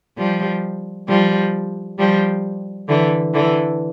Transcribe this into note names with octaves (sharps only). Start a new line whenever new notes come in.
F3 G3
F3 G3
F3 G3
D3 E3
D3 E3